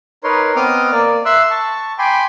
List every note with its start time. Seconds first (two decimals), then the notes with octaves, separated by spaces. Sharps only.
0.24 D#4 A#4 B4 C#5 C6
0.56 B3 C4 D#5 D6 D#6 F6
0.92 A#3 D5
1.25 E5 C6 E6 F#6
1.51 A5 C#6
1.99 G5 G#5 B5 C6 D6